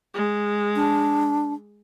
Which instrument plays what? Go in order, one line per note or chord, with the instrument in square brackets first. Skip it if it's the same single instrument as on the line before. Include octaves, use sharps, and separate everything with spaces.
[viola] G#3
[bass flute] D4